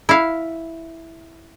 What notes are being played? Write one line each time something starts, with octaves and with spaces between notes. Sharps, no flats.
E4 F5